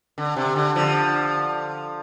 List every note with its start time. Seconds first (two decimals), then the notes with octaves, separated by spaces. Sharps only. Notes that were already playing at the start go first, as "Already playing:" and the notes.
0.18 D3
0.36 C3
0.56 D3
0.75 D3 F3